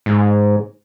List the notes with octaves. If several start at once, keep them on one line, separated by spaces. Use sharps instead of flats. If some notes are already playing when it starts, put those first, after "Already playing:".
G#2